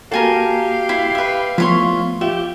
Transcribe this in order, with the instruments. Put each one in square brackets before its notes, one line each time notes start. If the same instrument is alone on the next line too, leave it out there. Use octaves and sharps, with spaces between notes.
[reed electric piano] A#3 F#4 A4 [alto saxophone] G4 [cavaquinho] A#4 G#5 A5 [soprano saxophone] F5
[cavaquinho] E4
B4 E5
[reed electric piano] F3 A3 B3 [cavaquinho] E4 C#5 C6 [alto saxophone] F4
[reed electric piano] F4 [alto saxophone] G4 [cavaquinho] E5